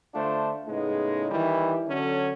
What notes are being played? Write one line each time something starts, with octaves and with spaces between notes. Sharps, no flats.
D3 A3 D4 F4 C5
A2 C#3 G#3 B3 D#4
D#3 E3 G3 E4
D3 F#3 C#4 A4